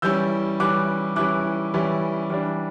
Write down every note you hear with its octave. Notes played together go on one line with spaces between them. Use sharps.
E3 G3 C#4 E4 E6 G6
E3 G3 C#4 E4 D6 F#6
E3 G3 C#4 E4 D6 F#6
E3 G3 C#4 E4
E3 G3 D4